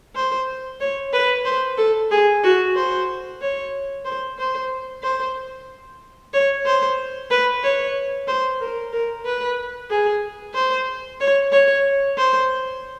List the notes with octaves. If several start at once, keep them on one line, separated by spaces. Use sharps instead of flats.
C5
C#5
B4
C5
A4
G#4
F#4
C5
C#5
C5
C5
C5
C#5
C5
B4
C#5
C5
A#4
A#4
B4
G#4
C5
C#5
C#5
C5